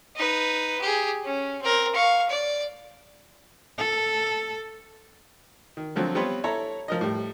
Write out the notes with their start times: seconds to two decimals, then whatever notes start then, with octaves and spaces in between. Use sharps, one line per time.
0.16 D#4 B4
0.81 G4 G#4
1.24 C#4
1.61 C4 A#4
1.95 F5 C#6
2.30 D5
3.78 A4
5.77 D#3
5.96 D3 F3 F#3 C4
6.15 G3 B3 C4 F4 B4 C#5
6.44 E4 A4 C#5 A#5
6.88 F3 A#4 D#5
7.01 A2 G3